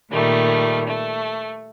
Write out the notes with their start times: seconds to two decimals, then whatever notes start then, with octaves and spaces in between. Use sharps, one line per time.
0.11 A#2 D#3 G3 A3
0.87 A3